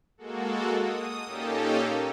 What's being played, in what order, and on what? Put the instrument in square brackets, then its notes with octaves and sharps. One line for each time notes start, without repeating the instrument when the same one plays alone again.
[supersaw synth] G#3 A#3 F#4 A4
D#6
A#2 A#3 C#4 D#4 G4 A4